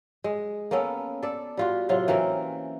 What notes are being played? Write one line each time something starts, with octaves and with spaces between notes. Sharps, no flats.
G#3
A#3 B3 C#4 A4
A4 D5
G3 F4 F#4
A2 C3 F#3 F4
E3 A#3 C4 C#4